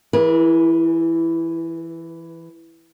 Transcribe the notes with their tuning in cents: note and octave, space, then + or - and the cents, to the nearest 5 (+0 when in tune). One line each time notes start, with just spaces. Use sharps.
E3 +5 G#4 -5 B4 -45